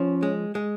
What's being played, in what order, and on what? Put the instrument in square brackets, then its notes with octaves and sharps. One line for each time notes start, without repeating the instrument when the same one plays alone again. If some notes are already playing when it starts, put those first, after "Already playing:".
Already playing: [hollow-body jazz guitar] F3 [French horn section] C#4
[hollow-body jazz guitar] G#3
G#3